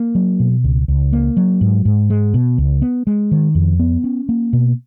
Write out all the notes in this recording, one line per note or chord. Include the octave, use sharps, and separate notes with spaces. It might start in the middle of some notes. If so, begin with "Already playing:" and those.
Already playing: A#3
F#3
B2
C#2
C#2
A#3
F#3
G#2
G#2
G#3
B2
C#2
B3
G#3
D#3
F2
B3
C#4
A#3
B2